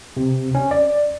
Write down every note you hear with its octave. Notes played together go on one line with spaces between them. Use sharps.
C3
C#4
D5